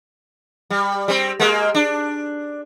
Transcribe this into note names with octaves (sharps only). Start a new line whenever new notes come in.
G3
G3 C4
G#3 A#3
D4